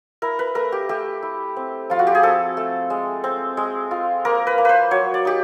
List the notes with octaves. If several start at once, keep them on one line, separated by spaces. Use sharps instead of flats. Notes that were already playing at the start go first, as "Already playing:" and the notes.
E4 A#4
B4
A3 A#4
G4
A3 G4
E4
C4
F3 F4
F#4
G4
G#4
C4 A4
A3
G#3
C4
G#3
F4
A#3 A#4
B4
A#3
B4 C5
F#3 C#5
D5
D#4 G4